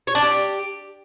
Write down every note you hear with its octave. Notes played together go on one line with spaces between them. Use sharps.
C#5
D4
G4